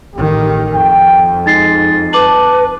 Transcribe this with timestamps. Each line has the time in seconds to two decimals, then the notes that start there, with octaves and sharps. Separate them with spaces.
0.14 A1 D#3 G4
0.74 F2 G5
1.46 G#3 D#4 A6 C7
2.13 B4 A5 D6 F#7